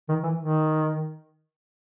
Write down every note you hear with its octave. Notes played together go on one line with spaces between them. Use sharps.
D#3
E3
D#3